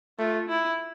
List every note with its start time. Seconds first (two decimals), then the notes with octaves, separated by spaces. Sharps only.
0.19 A3 F4
0.48 E4